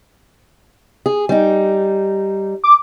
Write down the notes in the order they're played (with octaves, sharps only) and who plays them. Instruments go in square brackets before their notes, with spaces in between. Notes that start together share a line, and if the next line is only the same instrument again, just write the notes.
[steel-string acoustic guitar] G#4
G3 D#4
[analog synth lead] D6